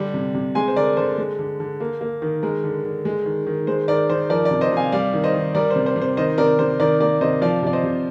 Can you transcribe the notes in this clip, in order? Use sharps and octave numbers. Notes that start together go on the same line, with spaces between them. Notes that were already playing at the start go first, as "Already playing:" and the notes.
Already playing: D3 G3
C3
C3
G#3 G#5 C6
C5
D3 A#4 D5
D3 C5
G#3
D3
D3
A#3
A#3
D#3
G#3 A#4
D3
D3
G#3
D#3
D#3
G#3 C5
D#3 A#4 D5
D#3 C5
F3 A#4 D5
A#4 D5
C3
C5 D#5
C3
F5 G#5
G3 D5 F5
D#3
C5 D#5
D#3
G3 A#4 D5
C5
C3
C5
C3
C5
D#3 C5 D#5
C3 A#4 D5
C3 C5
D#3 A#4 D5
A#3 A#4 D5
C3 C5 D#5
F3 D5 F5
C3 D5
C5 D#5
C3